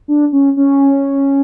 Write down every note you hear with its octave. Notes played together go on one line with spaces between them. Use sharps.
D4
C#4
C#4